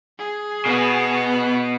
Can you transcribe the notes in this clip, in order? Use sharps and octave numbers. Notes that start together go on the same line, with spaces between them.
G#4
B2 B3